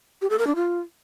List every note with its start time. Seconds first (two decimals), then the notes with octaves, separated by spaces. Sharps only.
0.21 G4
0.30 A4
0.38 A#4
0.47 D4
0.55 F4